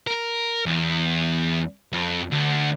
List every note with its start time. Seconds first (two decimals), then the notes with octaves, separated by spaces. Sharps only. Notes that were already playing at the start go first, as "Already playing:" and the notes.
0.07 A#4
0.66 E2
1.93 F2
2.31 D2